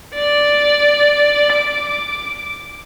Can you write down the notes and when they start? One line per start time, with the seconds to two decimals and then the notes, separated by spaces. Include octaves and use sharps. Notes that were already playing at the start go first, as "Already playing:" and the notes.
0.14 D5
1.53 D6